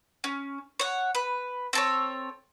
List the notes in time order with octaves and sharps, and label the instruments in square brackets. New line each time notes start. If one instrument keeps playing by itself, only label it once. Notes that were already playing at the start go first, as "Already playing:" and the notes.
[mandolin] C#4
C#5 F#5
B4
C4 A4 C#5